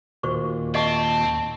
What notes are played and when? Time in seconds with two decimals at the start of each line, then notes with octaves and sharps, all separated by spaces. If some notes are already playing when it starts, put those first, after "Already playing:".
0.23 D#2 A#2 F#4 C5 C#6
0.75 C4 D#5 F5 A5 C#6